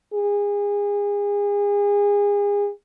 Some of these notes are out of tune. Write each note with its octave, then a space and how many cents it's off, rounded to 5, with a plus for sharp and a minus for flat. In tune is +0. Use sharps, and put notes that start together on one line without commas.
G#4 -30